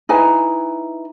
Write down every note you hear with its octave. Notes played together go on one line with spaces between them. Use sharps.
D#4 E4 B4 G#5